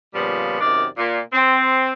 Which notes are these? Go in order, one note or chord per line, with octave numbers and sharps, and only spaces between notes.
A#2 C#3 F3 G3 B3
F#2 C3 D#3 D5
A#2
C4